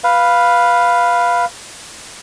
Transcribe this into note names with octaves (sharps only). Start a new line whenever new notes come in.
B4 F5